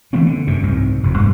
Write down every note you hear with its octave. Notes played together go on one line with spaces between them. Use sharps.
E3 A3 B3 C4
D3
F#2 C3
C2 G#2
F1 F2
G2 F3 A3